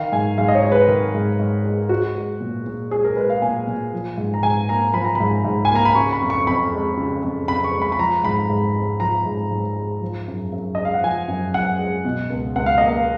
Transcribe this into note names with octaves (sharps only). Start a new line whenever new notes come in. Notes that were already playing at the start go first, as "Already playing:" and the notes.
Already playing: D#3 F5
G#2 G#5
G#2 F5
D#5
C#5
G#3
B4
D#3 A#4
G#2
G#2
G#3
G#3 F#4
G#3
A#2
A#2
G#3 G#4
A#4
G#3 B4
F5
A#2 G#5
A#2
F3
G#2
A#5
G#2 G#5
A#3 A#5
F3 B5
A#5
G#2 B5
G#2
G#5
A#3
A#5
B5
C#3 C#6
B5
F2
C#6
F2 B5
G#3
C#3
F2
F2 B5
C#6
G#3
B5
B5
F3 A#5
G#2 B5
G#2
G#3
F3 A#5
G#2
G#2
G#3
F3
F#2
F#2
G#3 D#5
F5
F#5
F3 G#5
F#2
F#2 F#5
G#3
B2
C#2
C#2 F#5
F5
A#3 D#5
F5